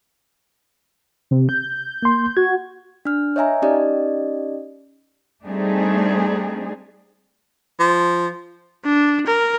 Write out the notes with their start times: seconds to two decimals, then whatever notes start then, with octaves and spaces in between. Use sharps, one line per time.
1.31 C3
1.49 G6
2.02 A#3 C6
2.37 F#4 G#6
3.05 D4 F6
3.36 C#5 D#5 E5 G#5 A#5
3.62 C#4 D#4 G4 D5 D#5
5.45 G3 A3 C4 D4 D#4 G#4
7.80 F3
8.85 D4
9.26 A#4